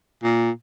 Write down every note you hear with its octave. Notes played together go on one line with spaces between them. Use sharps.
A#2